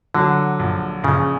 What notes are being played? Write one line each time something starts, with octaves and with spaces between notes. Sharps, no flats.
D3 F#3
A#1
A#1 C#3